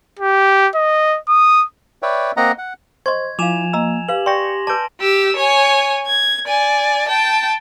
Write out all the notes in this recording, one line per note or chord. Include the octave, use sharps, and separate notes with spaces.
G4
D#5
D#6
B4 C#5 D5 E5 G5
A#3 C4 D#5 F#5 A#5
F#5
C5 D#5 C6 C#6 G#6
F3 E4 F5 G#5 D6 E7 F7
A#3 D#5 A#5 E6
G4 B4 F5 F#7
D5 G5 C6 C#6 A#6
B4 D5 A5 D6 G6 D7
G4 E6
C#5 G#5
G#6
D5 G#5
G5 A5